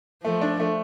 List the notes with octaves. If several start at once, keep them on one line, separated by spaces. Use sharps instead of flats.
F3 A3
D4
A3